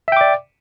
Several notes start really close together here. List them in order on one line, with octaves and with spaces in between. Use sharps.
E5 G5 D6 D5